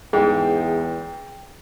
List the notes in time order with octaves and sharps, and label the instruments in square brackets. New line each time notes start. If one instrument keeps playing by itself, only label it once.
[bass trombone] E2 [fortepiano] G#2 [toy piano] G#4 [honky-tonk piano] G5